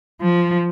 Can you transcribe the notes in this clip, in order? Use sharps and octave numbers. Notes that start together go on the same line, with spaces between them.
F3